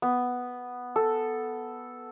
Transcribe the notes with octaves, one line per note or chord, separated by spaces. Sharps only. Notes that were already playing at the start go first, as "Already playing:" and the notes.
B3
A4